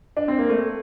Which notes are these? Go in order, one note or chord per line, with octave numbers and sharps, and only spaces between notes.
D4
C4
A#3
A3